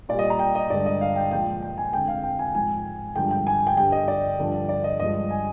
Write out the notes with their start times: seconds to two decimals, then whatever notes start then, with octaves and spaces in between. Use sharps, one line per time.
0.09 A#2 G3 D5
0.19 D#5
0.30 A#5
0.39 G5
0.55 D#5
0.70 G2 D3 G#3 D5
0.86 D#5
1.01 F5
1.16 G5
1.31 A#2 F3 G#3 G5
1.62 G5
1.78 G#5
1.93 F2 D3 G#3 G5
2.08 F5
2.23 G5
2.39 G#5
2.55 G#2 F3 G#3 G#5
3.16 G2 D3 F3 G#3 G5
3.31 G5
3.47 G#5
3.67 G5
3.77 G2 D3 G3 G5
3.92 D#5
4.08 D5
4.38 G2 D3 F3
4.69 D5
4.84 D#5
4.99 G2 F3 G#3 D#5
5.31 G#5